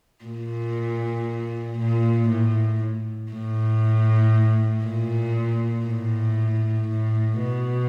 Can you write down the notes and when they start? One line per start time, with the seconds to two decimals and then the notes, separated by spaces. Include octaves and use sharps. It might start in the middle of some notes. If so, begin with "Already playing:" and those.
0.25 A#2
1.78 A#2
2.29 A2
3.32 A2
4.84 A#2
5.86 A2
6.88 A2
7.40 B2